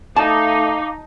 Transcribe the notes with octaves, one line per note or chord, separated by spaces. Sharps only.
A3 D#4 F5 A5 D6